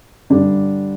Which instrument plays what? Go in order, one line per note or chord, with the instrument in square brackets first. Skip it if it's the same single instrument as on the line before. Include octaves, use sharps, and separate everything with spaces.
[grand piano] G2 D3 G3 D4